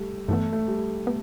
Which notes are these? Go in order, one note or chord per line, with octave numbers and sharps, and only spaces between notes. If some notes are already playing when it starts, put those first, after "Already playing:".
Already playing: G3 A3
G2 E3 A3 B3
A3
G3
A3 B3